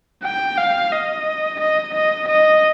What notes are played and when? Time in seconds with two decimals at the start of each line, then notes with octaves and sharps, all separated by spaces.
0.24 G5
0.58 F5
0.92 D#5
1.60 D#5
1.95 D#5
2.28 D#5